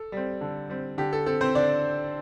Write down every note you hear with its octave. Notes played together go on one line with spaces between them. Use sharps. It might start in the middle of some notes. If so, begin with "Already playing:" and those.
Already playing: A4
G3 C4
D3
G3 C4
D3 G4
A4
C4 A4
C4 C5
D3 D4 D5